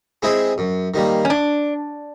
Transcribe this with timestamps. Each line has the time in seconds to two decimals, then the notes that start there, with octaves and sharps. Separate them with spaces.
0.22 G#3 C4 E4 G#4
0.58 F#2
0.94 D#3 G3 A#3
1.25 C#4
1.30 D4